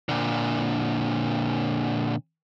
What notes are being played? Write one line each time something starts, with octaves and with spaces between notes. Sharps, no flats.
A#2 D3